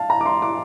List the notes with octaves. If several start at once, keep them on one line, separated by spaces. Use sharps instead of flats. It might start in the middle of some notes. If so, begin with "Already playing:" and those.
Already playing: F5 A5
A#5
D6
C6
D6